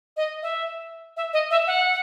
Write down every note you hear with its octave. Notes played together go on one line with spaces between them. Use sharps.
D#5
E5
E5
D#5
E5
F#5